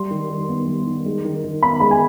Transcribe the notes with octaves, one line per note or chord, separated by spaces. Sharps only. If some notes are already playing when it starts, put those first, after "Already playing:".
Already playing: G3 C6
D#3
D#3
B3
G3
D#3
G#3
D#3
D#3
B3 B5
G#3 B5
G#5